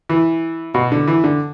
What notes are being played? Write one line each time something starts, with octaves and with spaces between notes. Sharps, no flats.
E3
B2
D3
E3
D3